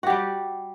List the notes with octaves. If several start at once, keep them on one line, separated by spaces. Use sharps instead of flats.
G3 F#4 G4